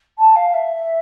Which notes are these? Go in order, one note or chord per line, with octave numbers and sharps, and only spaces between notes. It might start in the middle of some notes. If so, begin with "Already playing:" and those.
A5
F5
E5